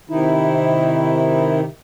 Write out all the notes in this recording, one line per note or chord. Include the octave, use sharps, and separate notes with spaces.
C3 D#3 D#4 E4